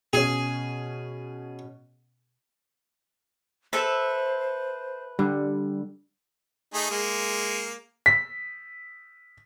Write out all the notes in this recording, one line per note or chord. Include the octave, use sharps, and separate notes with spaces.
B2 C#4 G#4
A4 B4 C5 E5
D3 G3
A3 D#4 G#4
G#3 A#3
B6